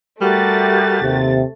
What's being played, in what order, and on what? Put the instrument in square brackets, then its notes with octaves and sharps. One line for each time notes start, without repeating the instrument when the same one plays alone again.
[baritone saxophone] G3 [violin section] A3 A6 [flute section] F#4 G4 A#4
[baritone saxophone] D#2 [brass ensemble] C3